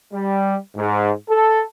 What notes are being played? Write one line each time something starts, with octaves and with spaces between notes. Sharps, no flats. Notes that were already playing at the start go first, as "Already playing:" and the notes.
G3
G#2
A4